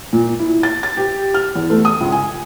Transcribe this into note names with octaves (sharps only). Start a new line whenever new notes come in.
A#2
E4
A6
A6
G4
F6
E2
A3
D#6
C#2
G#5